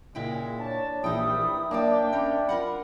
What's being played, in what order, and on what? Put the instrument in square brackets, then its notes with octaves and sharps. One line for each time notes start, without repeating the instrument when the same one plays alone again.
[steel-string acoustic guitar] A#2 E4 G5 [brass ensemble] C#3 G#3
[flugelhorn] D4 [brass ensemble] C#5 A5
[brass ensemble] A#1 E3 G3 [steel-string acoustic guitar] D#4 G5 [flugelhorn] E4 [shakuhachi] D#6
[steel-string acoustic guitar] A#3 C#5 D5 [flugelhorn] D4 [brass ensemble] E5 G5 [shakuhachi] D6
[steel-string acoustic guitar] C#4 A#4 [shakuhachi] B5
[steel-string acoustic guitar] F4 A#4 F#5